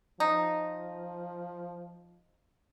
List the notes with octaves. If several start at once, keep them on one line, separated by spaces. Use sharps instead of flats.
F3 D#4